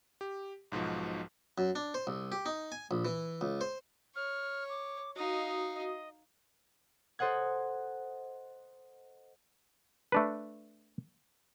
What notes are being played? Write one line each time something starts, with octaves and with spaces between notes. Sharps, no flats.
G4
B1 G#2 B2 F3
F#2
D4
C5
C2
G4
D#4
G#5
A#1
E3
C#2
C5
C#5 F6
D6
D#4 F#4 D#5 F5 D#6
D#5
A4 C5 D#5 F#5 G#6
A3 D4 B4